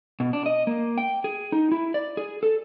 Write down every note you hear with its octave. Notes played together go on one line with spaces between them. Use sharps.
B2
D4
D#5
A#3
G5
G#4
D#4
E4
D5
G#4
A4